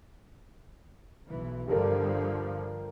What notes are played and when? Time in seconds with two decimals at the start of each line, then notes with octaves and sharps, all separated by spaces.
1.27 B1 E3
1.68 G2 D3 F3 G4 A4 A#4